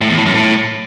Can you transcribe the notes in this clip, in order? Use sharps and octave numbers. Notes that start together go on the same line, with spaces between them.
A2
E2
A2
F#2
A2